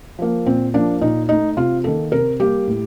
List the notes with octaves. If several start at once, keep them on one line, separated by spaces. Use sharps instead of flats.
F3 A#3
A#2 C4
F3 A#3 D4
A#2 D#4
A3 D#4
C3 F4
D#3 A#3 A4
C3 A#4
G3 A#3 G4
A2